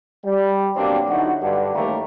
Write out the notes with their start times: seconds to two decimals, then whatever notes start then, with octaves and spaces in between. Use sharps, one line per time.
0.25 G3
0.76 B2 F#3 G3 A#3 C4 D4
1.09 D3 F#3 D#4 E4 F#4
1.42 G2 D3
1.75 A1 D#2 G3 A3 A#3 A#4